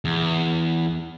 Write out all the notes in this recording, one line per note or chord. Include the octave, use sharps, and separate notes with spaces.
E2